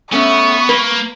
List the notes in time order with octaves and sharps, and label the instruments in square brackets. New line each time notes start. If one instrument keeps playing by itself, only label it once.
[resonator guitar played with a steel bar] A3 C#4 [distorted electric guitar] B3 [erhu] C#6
[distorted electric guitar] A#3 [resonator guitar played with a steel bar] B4